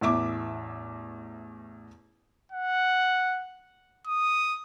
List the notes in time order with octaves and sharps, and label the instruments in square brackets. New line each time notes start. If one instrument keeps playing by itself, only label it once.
[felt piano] A1 E2 E5 D6
[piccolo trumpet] F#5
D#6